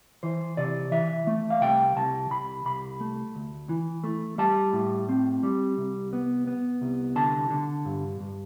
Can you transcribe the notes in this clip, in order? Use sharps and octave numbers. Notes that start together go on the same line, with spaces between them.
E3 C5
C3 D5
E3 E5
A3
F5
C2 G5
C2 A5
C2 B5
C2 B5
A3
D2
E3
A3
G3 A5
A2
C4
G3
C2
B3
B3
C2
D3 A5
D3
G2
G2